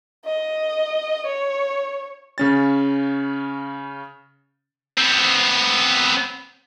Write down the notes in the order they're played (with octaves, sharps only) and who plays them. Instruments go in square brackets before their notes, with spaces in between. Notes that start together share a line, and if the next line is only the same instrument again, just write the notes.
[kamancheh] D#5
C#5
[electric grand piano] C#3 C#4 A6
[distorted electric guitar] B3 C4